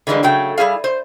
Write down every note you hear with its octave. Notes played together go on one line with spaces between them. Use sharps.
D3 E3 G3 G#3 A#3
C#3 F#3 A3 G5
G3 E4 G#4 F5
C5